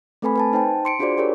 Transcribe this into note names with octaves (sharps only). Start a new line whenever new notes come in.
A3 C4 A4 B4 G#5 B5
B4 G#5 A5
D#4 C5 G5 A5
C6 C#7 D7
D4 F4 F#4 G#4 C5 D5
G4 G#4 A#4 C#5 D5